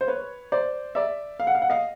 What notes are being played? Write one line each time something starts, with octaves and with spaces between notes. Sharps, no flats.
C5
B4 C#5
C5 D5
D5 E5
F5
F#5
F5
F#5
D#5 F5